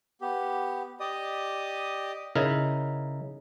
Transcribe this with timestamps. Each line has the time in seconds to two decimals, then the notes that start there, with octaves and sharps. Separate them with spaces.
0.21 B3 G4
1.00 G4 D5 D#5 D#6
2.35 C#3 D#4 E4 A#4